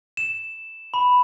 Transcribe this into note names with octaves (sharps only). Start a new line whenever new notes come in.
E7
B5